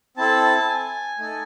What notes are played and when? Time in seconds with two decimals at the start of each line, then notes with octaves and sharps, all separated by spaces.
0.17 C4 E4 A4 A5
0.43 A5
0.68 G#5
1.19 A3 D#4 A4